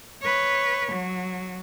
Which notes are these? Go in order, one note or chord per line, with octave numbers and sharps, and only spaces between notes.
B4 C#5
F#3